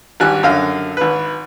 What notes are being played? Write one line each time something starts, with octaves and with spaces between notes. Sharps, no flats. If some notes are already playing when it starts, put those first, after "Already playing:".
G#1 G3 G#5 F#6
F#2 D3 F5 F6
G#1 B4